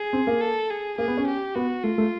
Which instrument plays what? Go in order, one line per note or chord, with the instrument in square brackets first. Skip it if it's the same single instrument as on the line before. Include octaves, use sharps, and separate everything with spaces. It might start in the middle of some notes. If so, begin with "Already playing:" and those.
Already playing: [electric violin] G#4
[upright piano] C4
A#3
[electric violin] A4
G#4
[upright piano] A#3 [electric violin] G#4
[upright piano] B3
C#4
[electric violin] G4
[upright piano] B3 [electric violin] F#4
[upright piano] A3 [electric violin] F4
[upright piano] A3